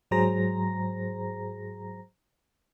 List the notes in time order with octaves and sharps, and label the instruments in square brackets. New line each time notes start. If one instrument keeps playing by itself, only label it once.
[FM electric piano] G#2 F#3 G#4 C5 A#5 A#6